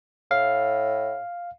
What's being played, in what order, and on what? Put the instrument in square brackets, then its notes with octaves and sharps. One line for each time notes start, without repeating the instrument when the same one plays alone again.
[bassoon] A2 [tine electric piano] F5